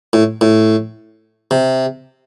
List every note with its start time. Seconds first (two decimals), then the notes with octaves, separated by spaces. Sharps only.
0.13 A2
0.41 A2
1.51 C3